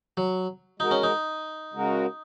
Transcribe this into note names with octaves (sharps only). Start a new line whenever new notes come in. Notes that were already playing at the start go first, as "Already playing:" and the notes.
F#3
G#3 D#4 F#4 A#4
C#4
D#4
C#3 G#3 F#4 A#4